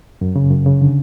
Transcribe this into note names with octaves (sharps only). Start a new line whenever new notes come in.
F#2
C#3
F#2
C#3
D3